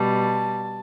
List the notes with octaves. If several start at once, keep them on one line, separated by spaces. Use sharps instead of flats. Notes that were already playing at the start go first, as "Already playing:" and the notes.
Already playing: B2 G3 A5